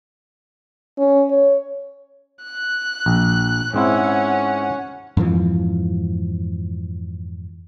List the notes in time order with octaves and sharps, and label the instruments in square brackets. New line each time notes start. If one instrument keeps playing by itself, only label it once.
[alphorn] C#4
C#5
[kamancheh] F#6
[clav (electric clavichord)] A#1
[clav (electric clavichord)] G#2 C4 E4 [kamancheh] C#4 F#5
[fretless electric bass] F2 G#2 E3 F3